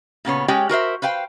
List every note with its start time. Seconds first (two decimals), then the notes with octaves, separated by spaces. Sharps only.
0.25 A#2 C#3 B3 C#5
0.48 G#3 C#4 G4 C#5 D5 G5
0.69 F#4 A#4 C5 E5
1.02 B4 C5 F5 G5